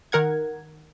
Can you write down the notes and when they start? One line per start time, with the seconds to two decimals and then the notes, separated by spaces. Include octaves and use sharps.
0.12 D#3 A#4 F#5 G#6